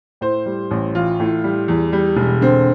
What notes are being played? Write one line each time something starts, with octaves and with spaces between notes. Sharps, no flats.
A2 C5
G3
A1
E3 F4
A2
G3
E2
G3
E1
D3 C4